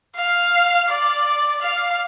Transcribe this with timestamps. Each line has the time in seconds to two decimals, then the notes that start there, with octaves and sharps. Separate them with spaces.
0.16 F5
0.89 D5
1.62 F5